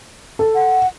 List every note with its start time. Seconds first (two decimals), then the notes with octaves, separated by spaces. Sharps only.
0.39 A4
0.55 F#5